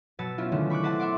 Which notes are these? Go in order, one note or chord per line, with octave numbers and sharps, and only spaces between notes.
B2 F#3 B4 E6 A6 C#7
B3 C#4 E4 F4
D3 D#3 G#3 A3 C#4 D4
B5 C#6 D6 F#6
C4 E4 B4 C5 F#5 A5
E5 F#5 C6 D6